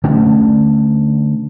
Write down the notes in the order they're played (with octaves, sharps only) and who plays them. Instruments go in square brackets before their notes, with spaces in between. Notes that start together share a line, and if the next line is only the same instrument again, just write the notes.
[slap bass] D3 A3 C#4